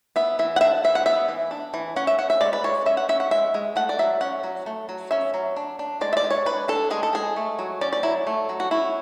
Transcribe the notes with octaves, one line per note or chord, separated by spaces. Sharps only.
B3 E5
E3 E5
F#5
D4 E5
E3 E5
F#5
B3 E5
E3
D4
E3
C#4 F#5
E5
C#4 F#5
E5
G#3 D5
B4
G#3 C#5
C#4 E5
F#5
C#4 E5
F#5
G#3 E5
G#3
A3 F#5
D5
F#3 E5
C#4 F#5
F#3
A3
F#3
C#4 E5
F#3
D4
D4
G#3 D5
E5
D5
G#3
C#5
D4 B4
D4 A4
G#3 G#4
A4
G#3 G#4
A3
F#3
C#4 D5
D5
F#3 E4
A3
F#3
F#4
C#4 E4